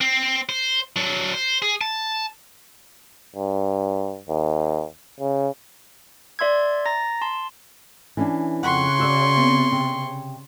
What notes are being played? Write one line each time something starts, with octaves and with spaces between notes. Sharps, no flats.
C4
C5
F#3 D4
C5
G#4
A5
G2
D#2
C#3
D5 E5 C6 E6 G#6
A#5 A6 A#6
A5 C6
E3 C#4 D4
F2 C#3 F#5 C6 C#6 F#6
F#4 C#5 D5 E6 F#6
B3 C4
C3